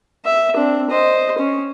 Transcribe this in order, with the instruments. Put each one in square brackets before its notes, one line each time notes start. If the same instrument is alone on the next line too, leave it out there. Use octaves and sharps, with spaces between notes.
[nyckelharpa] E5
C4 D4
C5 D#5
C#4